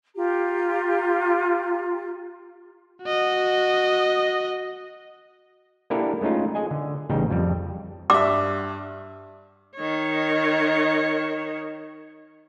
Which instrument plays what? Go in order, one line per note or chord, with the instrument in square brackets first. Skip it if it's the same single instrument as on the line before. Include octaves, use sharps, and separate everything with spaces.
[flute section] F4 G4 A#5
[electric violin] F#4 D#5
[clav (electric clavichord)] A#3 D4 E4 G4 A4 A#4
G#3 A3 C#4 D#4 F4
G#4 D#5 G#5
D3
A1 C#3 G3 D#4 G5
F2 G3
[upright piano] G2 E5 [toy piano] D6
[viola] D#3 C#5